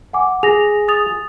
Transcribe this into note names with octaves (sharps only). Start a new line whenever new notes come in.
F#5 G#5 D6
G#4 A#6 F7
D#6 A6 F7